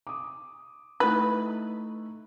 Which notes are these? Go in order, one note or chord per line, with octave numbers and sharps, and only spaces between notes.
D6 D#6
A3 D#4 E4 B4